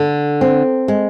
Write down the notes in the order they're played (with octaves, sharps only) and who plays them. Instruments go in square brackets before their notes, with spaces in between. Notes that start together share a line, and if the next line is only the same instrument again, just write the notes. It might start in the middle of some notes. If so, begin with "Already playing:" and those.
Already playing: [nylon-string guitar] D3
C4
G#3